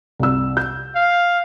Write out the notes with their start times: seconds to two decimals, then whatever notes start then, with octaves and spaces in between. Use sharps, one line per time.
0.20 C2 E6
0.57 G6
0.96 F5